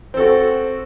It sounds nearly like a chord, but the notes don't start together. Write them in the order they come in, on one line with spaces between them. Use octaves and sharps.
C4 A4 F#4